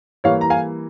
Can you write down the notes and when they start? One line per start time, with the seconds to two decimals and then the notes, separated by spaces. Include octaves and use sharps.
0.24 E3 G3 A#3 C#5 F5
0.41 A#5
0.50 F5 G#5